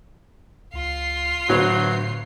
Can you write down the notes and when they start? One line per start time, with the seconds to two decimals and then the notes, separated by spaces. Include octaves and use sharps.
0.74 C#2 F4 C7
1.49 D2 A2 F#3 B3 F#4